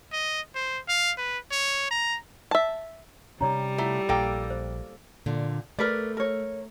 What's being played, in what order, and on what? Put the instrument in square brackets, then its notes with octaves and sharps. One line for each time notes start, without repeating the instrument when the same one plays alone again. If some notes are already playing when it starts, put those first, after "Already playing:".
[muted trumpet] D#5
C5
F5
B4
C#5
A#5
[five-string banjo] E5 A5
[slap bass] C3 C#4 [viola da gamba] G3 [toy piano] D#4 C#5 A#5
[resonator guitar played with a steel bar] A3 [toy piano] E4 F4 F#5
[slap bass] A#1 [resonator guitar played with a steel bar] A#3 A4 G5
[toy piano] C5
[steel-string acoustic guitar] A#2 D3
[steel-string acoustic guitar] A3 [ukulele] A#4 B4 D5
[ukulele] A#4 C#5